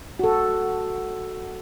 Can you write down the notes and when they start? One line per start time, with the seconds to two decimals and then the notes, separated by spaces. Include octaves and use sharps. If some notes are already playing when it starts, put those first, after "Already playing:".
0.19 F#4 A4